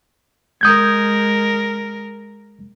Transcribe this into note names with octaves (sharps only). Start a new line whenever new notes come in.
G#3 A#4 D#6 G6 G#6